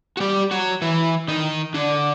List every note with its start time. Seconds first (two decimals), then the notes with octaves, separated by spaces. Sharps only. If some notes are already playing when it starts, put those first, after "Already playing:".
0.17 F#4
0.20 G3 G4
0.51 F#3 F#4
0.82 E3 E4
1.28 D#3 D#4
1.74 D3 D4